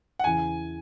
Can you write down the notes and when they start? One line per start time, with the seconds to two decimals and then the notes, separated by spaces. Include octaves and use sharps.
0.19 F#5
0.24 E2 C#3 E3 G#5